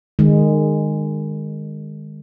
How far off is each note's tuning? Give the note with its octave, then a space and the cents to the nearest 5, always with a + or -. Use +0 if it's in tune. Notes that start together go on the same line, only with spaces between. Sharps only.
D#3 -30 G#3 -15